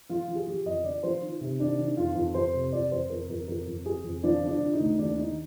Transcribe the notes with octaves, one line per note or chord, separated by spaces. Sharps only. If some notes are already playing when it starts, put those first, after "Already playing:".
F3 F4
F3
G#4
F3 G4
F2 D#5
D3 D5
F3 C5
D#3
C3
D#3 D4
D#3
F2 F4
F2
F2 C5
C3
F2 D5
F2 C5
F2 A#4
F2 A#4
F2 A#4
F2
F2 G#4
F2
F3 D4
D3
D4
D3
D#4
D2
D#2 D4
D#3 D#4